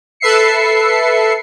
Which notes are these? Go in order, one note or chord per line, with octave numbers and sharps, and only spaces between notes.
A4 B4 E5 C7 C#7